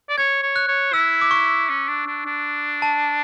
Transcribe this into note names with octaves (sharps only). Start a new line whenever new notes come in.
D5
C#5 G#6
C#5
F#6
C#5
E4 E6
D6
C#6
C#4
D4
D4
D4
A5